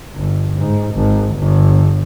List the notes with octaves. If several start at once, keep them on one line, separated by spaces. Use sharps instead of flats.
G1
G#2
G#1
G1